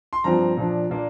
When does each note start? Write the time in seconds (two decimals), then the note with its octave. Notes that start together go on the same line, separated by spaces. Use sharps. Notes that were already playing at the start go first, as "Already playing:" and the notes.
0.13 C6
0.24 G2 F3 C4 A#5
0.57 A#2 F3 D4
0.90 A#2 A#3 D4